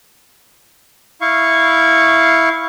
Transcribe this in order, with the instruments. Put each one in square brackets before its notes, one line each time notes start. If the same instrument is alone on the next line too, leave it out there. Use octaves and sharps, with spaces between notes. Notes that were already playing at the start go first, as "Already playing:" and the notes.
[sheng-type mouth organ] E4 F5 C#6